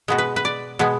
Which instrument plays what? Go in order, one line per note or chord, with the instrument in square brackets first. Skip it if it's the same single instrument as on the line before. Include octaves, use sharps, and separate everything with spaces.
[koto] B2 G#3 B3 F#4
B4
B4
D5
B2 G#3 B3